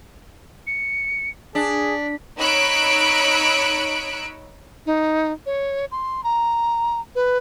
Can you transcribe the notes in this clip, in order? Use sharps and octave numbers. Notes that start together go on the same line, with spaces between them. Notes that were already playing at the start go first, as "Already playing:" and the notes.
C#7
D4 G#4 B6
D#4 C#5 B5 E6 F#6 D7
D#4
C#5
C6
A#5
B4